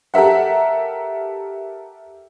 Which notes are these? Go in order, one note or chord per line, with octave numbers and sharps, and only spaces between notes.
G4 A4 A#4 E5 F#5